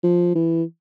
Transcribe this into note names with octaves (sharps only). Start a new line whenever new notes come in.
F3
E3